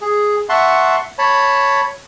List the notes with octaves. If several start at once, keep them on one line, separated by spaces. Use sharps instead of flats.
G#4
E5 F#5 A5 C6 C#6
C#5 A5 B5